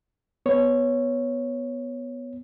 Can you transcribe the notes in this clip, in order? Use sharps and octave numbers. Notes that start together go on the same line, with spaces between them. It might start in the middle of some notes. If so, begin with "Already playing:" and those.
B3 C#5